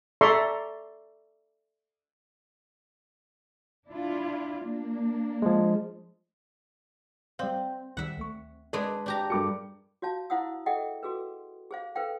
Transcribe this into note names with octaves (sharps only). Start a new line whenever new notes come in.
A4 D5 E5 A#5 C6 C#6
D4 E4 F4
A#3 D4
F3 G#3
G3 C4 D5 F5
D2 D#3 G3 E5 F#5
D2 A3 C#6
G#3 D4 G#4 B4
D4 G4 A#5
G2 F#4 A4 A#4 D6 C#7
F#4 C#5 F5 A5
E4 C5 F5 F#5 D#6 E6
G#4 A4 D#5 E5 F#5 G5
F#4 G#4 A4 B4
G#4 C5 F5
A4 B4 C5 F5 G5